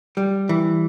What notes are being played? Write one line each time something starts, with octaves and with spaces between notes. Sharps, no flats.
G3
E3